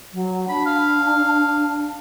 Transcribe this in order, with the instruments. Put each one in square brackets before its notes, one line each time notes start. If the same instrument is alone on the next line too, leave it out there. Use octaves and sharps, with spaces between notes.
[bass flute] F#3
[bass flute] D4 [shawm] B5
[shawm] F5